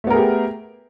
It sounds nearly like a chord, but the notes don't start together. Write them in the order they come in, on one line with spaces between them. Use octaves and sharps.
A3 B3 A#4 G#4 G4